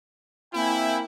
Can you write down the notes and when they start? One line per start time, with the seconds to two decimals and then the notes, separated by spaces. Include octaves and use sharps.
0.54 A#3 C4 E4 G5 G#5